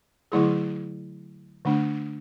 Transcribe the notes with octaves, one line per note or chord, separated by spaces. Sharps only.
D3 F#3 A3 E4 G#4
D3 A3 D4